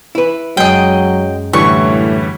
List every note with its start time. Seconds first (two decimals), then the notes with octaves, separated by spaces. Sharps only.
0.15 E4 B4
0.57 F#2 F#3 G#3 D#5 G5
1.53 A2 D3 E3 G3 C#6